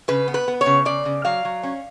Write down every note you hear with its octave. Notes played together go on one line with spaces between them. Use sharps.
C#3 B4
B3
B4
B3
C#5
C#3
C#3 D5
C#3
F#3 F5
F#3
C#4